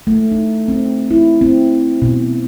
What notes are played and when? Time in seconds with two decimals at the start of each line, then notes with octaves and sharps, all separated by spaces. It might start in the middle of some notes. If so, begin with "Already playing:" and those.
0.07 A3
0.32 D#4
0.68 C4
1.11 E4
1.41 C4
2.02 B2